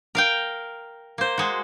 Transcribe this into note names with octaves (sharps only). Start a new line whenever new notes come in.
A#4 F5 G5
A#3 C5
G#3 F#4